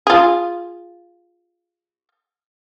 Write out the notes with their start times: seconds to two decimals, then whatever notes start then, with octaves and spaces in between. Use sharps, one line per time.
0.07 F4 G#4